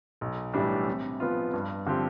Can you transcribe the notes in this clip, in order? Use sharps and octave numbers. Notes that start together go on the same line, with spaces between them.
B1
A2 E3 G3 D4
C3
F3 B3 F4
G2
D3 F3 C4 G4